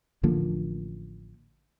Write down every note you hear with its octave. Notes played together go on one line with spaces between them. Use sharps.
A1 D3 F3 A#3